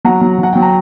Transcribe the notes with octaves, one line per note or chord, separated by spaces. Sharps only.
F#3 F#5 A#5
F#3
F#3 F#5
F#3 G5
A#5